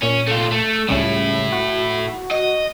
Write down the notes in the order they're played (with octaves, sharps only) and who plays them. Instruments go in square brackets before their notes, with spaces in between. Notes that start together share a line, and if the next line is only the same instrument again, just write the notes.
[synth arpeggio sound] A#2 [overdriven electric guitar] C#4
[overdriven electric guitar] A3 F4
A3
[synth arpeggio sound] C#2 C#3 G3 [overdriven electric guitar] A2 E4
[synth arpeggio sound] F#4
[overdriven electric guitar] D#5